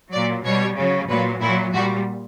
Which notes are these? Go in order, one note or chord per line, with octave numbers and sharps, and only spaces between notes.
A#2 F#3 D5
B2 G3 C#5
C#3 F#3
A#2 F#3 B4
A#2 F#3 E4
A#2 G3 F#4